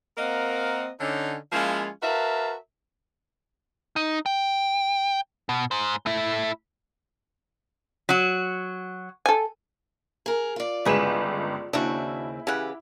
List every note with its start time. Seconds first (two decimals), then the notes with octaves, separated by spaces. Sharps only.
0.17 A#3 C4 A#4 D#5 F5 F#5
1.00 D3 C#4 D#4
1.52 F3 G#3 A#3 C#4 E4 F4
2.03 F#4 A#4 B4 E5 F5 A5
3.96 D#4
4.26 G5
5.49 B2
5.71 G#2 C5
6.06 A3 E4
8.09 F#3 F#4
9.26 A4 G#5
10.26 G#4 A#4
10.56 F4 D5
10.85 G1 C#2 E4 G#4 B4 E7
11.73 D#2 C#3 C4 D4 E4 F#4
12.47 C#3 E3 G4 F#5